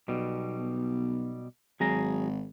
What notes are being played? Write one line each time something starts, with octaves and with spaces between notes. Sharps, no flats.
B1 B2 G3
G#1 F#3 G#4 A#5